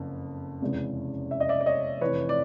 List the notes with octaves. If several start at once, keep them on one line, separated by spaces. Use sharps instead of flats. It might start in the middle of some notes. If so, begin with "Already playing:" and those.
Already playing: F#1 F2
F1 E2 C#3 E3 G#3
E5
D#5
D5 E5
D5
C#5 D#5
F1 F2 C3 E3 B4 C#5
D5